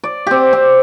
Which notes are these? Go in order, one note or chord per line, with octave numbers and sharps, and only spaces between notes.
D5
C4 G4
C4